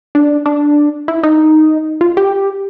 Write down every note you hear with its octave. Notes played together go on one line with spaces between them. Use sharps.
D4
D4
E4
D#4
F4
G4